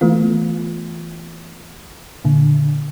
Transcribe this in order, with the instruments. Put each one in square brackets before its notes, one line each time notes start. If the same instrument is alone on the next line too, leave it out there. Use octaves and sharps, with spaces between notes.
[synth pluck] E3 A3 B3 F4
A#2 D3